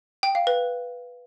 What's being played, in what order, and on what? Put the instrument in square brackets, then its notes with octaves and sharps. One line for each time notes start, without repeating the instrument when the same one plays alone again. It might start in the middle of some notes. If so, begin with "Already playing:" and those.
[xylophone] G5
F5
B4